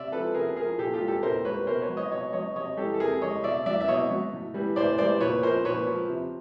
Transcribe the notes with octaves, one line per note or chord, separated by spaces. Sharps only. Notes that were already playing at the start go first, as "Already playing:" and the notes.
Already playing: C3 D5 E5
F3 A4 B4
C3 G#4 A#4
F3 G#4 A#4
A#2 G4 A4
F4 G4
G3
G4 A4
A#2 A#4 C5
G3 B4 C#5
B2 A#4 C5
B4 C#5
F#3
C#5 D#5
B2 C#5 D#5
F#3 C#5 D#5
C3 C#5 D#5
E3 G3 G4 A4
A4
C3 G#4 A#4
E3 G3 C#5 D#5
B2 D5 E5
F#3 D5 E5
E5
B2 C#5 D#5
F#3
A2
E3 G3
A2 C5 D5
E3 G3 C5 D5
A#2 B4 C#5
F3 A#4 C5
A#2 B4 C#5
F3
C3